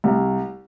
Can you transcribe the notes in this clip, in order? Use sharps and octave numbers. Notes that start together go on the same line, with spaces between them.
C2